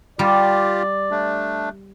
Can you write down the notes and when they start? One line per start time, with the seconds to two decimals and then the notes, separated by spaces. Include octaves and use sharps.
0.19 G3 F4 G4 D5
1.11 A3 D4